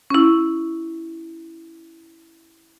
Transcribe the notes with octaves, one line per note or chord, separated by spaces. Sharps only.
C#4 E4